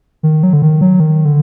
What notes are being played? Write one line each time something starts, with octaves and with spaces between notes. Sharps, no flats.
D#3
F#3
D3
D#3
F#3
D#3
D3